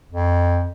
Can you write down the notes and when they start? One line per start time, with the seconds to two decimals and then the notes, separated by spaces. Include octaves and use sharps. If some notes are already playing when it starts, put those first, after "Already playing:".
0.12 F2